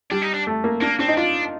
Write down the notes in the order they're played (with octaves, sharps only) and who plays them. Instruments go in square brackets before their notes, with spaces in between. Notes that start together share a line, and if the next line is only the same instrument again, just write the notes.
[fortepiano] G3 [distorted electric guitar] D4
[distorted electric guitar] D#4
D4
[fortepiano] A3
A#3
[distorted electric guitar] A#3 [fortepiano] D4
[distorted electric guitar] C4 [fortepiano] D4
[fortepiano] D#4
[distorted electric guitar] D4 [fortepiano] F4